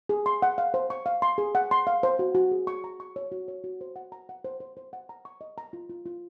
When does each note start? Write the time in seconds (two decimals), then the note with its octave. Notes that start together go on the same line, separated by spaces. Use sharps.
0.09 G#4
0.26 C6
0.42 F#5
0.58 F5
0.74 C5
0.90 C#6
1.06 F5
1.22 C6
1.38 G#4
1.55 F#5
1.71 C6
1.87 F5
2.03 C5
2.19 F#4
2.35 F#4
2.51 G#4
2.67 C#6
2.84 A#5
3.00 C#6
3.16 C#5
3.32 F#4
3.48 C#5
3.64 F#4
3.81 C5
3.96 F#5
4.12 A#5
4.29 F#5
4.44 C5
4.60 C5
4.77 C5
4.93 F#5
5.09 A#5
5.25 C#6
5.41 D#5
5.58 A#5
5.73 F4
5.90 F4
6.06 F4